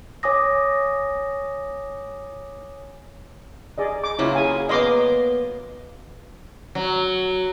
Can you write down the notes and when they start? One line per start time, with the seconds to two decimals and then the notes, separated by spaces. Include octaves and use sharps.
0.23 C#5 G#5 D6 D#6 A#6
3.78 G#4 D5 D#5
4.04 D6
4.19 C#3 F#3 A#3 E4 F4
4.35 G#4 G#5
4.69 A#3 B3 D#5 C6 D6
6.75 F#3